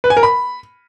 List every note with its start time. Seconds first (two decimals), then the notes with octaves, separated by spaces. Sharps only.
0.04 B4
0.10 G#5
0.17 A#4
0.23 B5